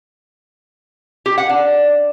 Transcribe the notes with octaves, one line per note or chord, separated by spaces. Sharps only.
G4
F#5
D4